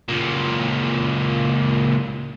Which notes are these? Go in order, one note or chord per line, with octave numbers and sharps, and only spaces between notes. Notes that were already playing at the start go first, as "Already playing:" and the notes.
C#2 A#2